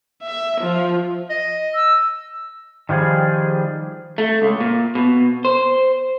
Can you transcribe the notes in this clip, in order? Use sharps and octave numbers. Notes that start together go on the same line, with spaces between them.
E5
F3
D#5
E6
D#3 F3 G3 G#4
A3
C#2
A#2
B2
C5